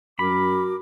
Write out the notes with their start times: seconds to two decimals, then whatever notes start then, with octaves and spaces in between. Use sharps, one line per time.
0.19 F#2 F#4 A#4 B5 D6